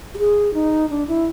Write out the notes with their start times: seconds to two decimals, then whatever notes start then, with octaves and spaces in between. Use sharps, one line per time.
0.14 G4
0.18 G#4
0.54 D#4
0.90 D4
1.08 E4